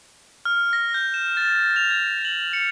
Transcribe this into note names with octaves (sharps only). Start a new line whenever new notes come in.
F6
A#6
G6
E7
A6
F7
G#6
F#7
C#7